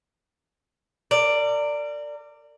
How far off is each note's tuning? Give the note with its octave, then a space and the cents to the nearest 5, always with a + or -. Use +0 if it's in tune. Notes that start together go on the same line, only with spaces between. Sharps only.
A#4 -35 D5 +0